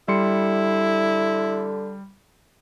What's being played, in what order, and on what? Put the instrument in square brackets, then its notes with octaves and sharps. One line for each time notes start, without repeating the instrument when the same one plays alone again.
[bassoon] D3 [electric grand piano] G3 C6 C#7 [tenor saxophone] E4